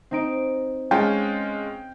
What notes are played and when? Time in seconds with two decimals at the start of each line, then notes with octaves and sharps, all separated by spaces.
0.11 C4 D#4 D7
0.91 G#3 C#4 F4 G5